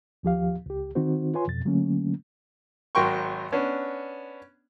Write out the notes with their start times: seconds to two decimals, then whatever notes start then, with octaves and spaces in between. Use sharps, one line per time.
0.23 D#2 F3 G4 F5
0.66 C#2 G4
0.95 D#3 C4 D#4 F#4 C5
1.34 F4 B4 C#5 G#5 C6
1.48 F2 B2 A6
1.65 D3 F#3 A3 A#3 C#4
2.95 G#1 F#3 A#4 G5 C6 C#6
3.52 B3 C#4 D4